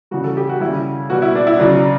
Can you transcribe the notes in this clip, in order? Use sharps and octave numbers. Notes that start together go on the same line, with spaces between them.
C#3 E3 G3 F#4
A4
G4
F#4
C#3 G3 E4
B2 G3 F#4
E4
D4
E4
C#3 F#3 D4